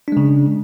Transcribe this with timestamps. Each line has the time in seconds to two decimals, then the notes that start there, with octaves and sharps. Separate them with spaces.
0.08 D4
0.12 G#3
0.17 C#3